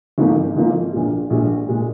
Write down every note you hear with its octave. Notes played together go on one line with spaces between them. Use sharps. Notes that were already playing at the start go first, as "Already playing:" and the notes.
G#1 G#2 F3 A#3 F4
G#1 G#2 F3 A#3 F4
A#1 A#2 G#3
A#1 A#2 G#3
A#2 G#3